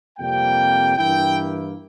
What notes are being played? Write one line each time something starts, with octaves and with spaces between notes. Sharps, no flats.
F2 C3 G3 A#3 G5
G2 E3 A#3 E4 G5